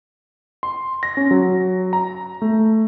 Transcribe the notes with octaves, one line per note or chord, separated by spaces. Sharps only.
C6
A#6
C#4
F#3
A#5
A3